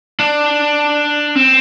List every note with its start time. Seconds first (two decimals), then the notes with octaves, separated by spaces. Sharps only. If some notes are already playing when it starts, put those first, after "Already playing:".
0.20 D4
1.35 C4